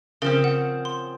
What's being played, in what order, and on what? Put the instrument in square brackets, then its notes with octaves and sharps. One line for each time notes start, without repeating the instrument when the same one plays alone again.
[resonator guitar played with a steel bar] C#3 F3 C4 [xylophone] A#4
[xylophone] F#5
C6